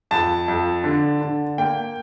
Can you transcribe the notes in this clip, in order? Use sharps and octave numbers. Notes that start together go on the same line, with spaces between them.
F2 A5
F2
D3
D3
A#3 G5